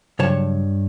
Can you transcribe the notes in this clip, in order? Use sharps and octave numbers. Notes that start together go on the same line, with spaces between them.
G2 C#3 F#3 C#5 A5